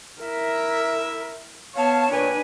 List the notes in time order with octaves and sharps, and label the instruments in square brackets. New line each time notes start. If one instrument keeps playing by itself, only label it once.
[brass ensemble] E4 E5 [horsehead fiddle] A#4
[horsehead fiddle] B3 [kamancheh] C#5 [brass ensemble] F5 [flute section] A5
[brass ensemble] A#2 G5 [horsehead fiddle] D4 B4 [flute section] G#5